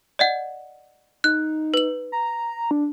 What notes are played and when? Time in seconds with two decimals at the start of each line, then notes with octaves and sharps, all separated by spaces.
0.19 D5 D#5 F#5
1.24 D#4 F#6
1.74 B4 F#7
2.12 A#5
2.71 D4